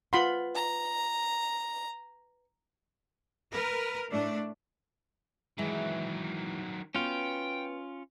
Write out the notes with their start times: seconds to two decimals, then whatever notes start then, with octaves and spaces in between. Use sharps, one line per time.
0.13 F4 B4 F#5 B5 C6
0.55 A#5
3.51 A#4 B4
4.12 A2 A3 D4
5.58 D#3 E3 F#3 G#3
6.95 B3 C#4 F4 F#4 G5